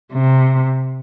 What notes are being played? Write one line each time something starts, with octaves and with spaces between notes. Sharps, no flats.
C3